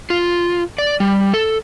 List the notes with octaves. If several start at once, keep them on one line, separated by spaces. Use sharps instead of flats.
F4
D5
G3
A4